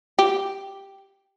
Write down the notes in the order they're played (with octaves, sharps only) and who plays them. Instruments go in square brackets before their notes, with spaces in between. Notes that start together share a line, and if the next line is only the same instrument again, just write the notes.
[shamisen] G4